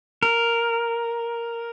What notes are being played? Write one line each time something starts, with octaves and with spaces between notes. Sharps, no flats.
A#4